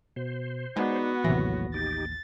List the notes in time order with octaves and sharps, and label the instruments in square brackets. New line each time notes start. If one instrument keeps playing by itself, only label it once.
[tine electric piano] B2 [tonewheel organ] C5
[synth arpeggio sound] G#3 [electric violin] B3 F#4 [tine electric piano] D#4 D5
[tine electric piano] A1 D#2 A#6 [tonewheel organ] A2 F#3 [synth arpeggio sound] C3 E3
[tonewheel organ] D#4 G4 [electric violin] A6